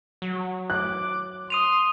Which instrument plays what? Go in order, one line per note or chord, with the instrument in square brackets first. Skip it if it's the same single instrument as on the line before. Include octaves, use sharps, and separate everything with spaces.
[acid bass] F#3
[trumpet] D6 [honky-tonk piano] F#6
[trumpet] C6 [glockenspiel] D#6 D#7 F7